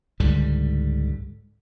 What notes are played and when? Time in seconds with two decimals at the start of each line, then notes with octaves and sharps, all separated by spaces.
0.20 C#2 G#2 D3 G3